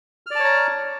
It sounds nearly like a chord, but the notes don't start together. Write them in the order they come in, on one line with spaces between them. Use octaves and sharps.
F6 D5 A5 C#5 A#5